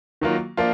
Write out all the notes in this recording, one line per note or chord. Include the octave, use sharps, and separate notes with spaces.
D#3 F#3 A#3 F4
F3 A#3 D4 F4